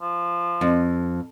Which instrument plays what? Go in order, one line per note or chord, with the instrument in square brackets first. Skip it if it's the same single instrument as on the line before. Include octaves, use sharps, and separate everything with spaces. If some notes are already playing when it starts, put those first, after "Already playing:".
[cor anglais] F3
[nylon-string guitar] F2